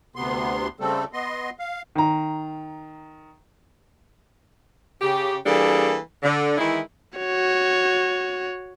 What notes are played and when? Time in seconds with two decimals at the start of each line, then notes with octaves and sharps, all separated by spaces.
0.16 D2 C3 B3 C6
0.80 C#3 G3 A3 C4 A4
1.13 B3 D#5 C6
1.59 F5
1.95 D#3 A#5
5.02 C#3 G4
5.45 E3 G3 A#3 D4 G#4 A4
6.23 D3
6.58 D#3 E3 G#3 E4
7.19 F#4 C#5